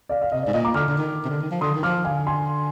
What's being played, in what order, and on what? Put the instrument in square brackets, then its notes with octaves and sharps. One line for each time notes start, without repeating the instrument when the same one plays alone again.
[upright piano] D5 F5
F5
[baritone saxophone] C3 [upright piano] D#5
[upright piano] D5
[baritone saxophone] G#2
[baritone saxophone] A#2 [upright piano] D#5
[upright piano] A#5 D6
[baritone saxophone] D3 [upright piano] D6 F6
[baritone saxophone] D3
D#3
C3
D3
D#3
F3
[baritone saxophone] D3 [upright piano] C6 D#6
[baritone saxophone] D#3
[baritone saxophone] F3 [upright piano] D6 F6
[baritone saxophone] D3 [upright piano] F5 G#5
[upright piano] G#5 C6